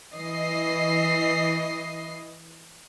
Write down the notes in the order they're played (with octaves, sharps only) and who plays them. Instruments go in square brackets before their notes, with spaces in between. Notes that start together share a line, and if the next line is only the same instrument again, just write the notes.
[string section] E3 D#5 C7